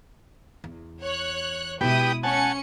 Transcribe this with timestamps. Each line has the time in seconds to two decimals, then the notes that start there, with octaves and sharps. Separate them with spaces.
0.64 E2
1.01 C#5 F#6
1.81 B2 G#3 E4 G4 B4 G5 D#6
2.23 C#4 F#5 G#5 A5 C#7